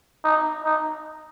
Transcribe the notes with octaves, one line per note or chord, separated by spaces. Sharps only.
D#4
D#4